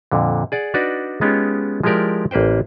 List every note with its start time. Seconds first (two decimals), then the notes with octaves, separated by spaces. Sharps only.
0.12 F2 A#2 D3
0.52 G#4 D5 F#5
0.74 D4 D#4 F#4 B4 D5
1.21 G#3 B3 C#4 D#4 F4 G4
1.83 F3 G#3 E4 G4 A#4 D5
2.31 A1 A#3 B4 C5 G5